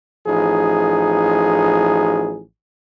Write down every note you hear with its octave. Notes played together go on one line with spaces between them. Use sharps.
A1 F3 D#4 G#4